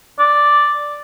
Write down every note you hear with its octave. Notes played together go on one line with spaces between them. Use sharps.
D5